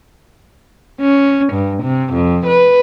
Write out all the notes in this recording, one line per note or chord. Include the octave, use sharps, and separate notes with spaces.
C#4
G2
C3
F2
B4